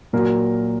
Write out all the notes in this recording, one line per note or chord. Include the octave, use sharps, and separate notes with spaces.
A#2 F#3 A#4